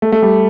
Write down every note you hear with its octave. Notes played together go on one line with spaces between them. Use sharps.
A3
A3
G3